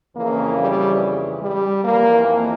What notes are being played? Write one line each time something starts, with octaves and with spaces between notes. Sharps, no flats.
F2 C#3 E3 A#3
G3
G3
F2 E3 A#3
A#3